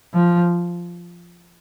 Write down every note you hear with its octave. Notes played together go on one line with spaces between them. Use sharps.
F3